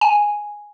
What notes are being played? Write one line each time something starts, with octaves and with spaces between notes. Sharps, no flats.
G#5